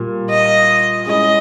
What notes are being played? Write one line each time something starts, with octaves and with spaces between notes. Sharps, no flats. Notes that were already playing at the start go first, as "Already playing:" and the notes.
Already playing: A#2 G3 A#3
D#5
G#3 C#4 E4 D#5